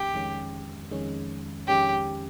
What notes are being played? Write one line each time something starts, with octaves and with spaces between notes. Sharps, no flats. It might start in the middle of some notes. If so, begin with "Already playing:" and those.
Already playing: F2 D#3 G#3 C#4 G4
F2 D#3 G#3 C#4
F2 D#3 G#3 C#4
F2 D#3 G#3 C#4 G4